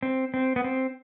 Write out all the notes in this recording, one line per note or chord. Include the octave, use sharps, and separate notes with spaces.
C4
C4
B3
C4